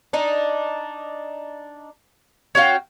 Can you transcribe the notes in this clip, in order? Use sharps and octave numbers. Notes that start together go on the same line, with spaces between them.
D4 D#4
C#4 F#4 F5 G5